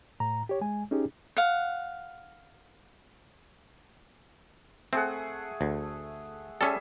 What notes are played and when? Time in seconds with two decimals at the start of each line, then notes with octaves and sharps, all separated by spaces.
0.20 A2 A#5
0.49 G4 C#5
0.61 G#3 G#5
0.91 C#4 D#4 G4 G#4
1.37 F5 F#5
4.93 A3 C4 G#4 F#5
5.61 D2
6.61 G3 C#4 G#4 A4 E5